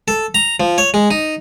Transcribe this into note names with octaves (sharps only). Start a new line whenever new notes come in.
A4
A#5
F3
C#5
G#3
D#4